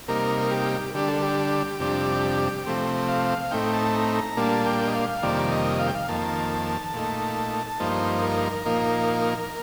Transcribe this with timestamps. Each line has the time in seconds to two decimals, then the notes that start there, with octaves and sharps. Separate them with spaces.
0.08 C3 G3 A#3 D#4 A#4
0.51 G4
0.94 D3 G3 D4 G4
1.08 A4
1.22 G4
1.80 F2 C3 G3 D4
2.66 C3 F3 A3 C4
3.08 F5
3.51 A2 A3 C4 D#4 G5
3.73 A5
3.94 A#5
4.16 A#5
4.37 A#2 G3 A#3 D4 A5
4.66 G5
4.87 D#5
4.95 F5
5.22 F2 C3 D#3 G3 A#3 D5
5.51 D#5
5.79 F5
5.87 G5
5.95 F5
6.08 F2 D#3 A#3 A5
6.94 A#2 A3 D#4
7.80 G2 F3 A#3 D#4 C5
8.22 A#4
8.65 A#2 F3 A#3 D#4